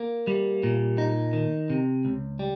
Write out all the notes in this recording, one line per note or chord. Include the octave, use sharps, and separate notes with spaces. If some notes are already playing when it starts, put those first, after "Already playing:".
Already playing: A#3
G3
A#2
D#4
D#3
C3
C#2
G3